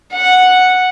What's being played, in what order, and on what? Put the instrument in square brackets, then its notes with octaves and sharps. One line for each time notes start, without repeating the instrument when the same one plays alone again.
[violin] F#5